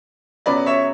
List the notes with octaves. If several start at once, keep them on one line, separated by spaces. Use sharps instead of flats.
F#2 C#3 F#3 B3 B4 D5
C#5 E5